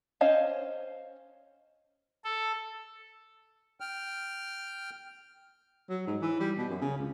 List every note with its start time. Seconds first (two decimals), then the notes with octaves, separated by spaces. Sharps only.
0.21 C#4 C5 C#5 D#5 F5
2.24 A4
3.80 G5 F6
5.89 F#3
6.07 G#2
6.22 E3
6.40 G3
6.57 B2
6.69 F#2
6.82 C#3
6.98 C#2